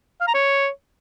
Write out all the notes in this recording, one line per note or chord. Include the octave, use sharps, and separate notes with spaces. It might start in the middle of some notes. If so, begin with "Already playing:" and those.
F5
A#5
C#5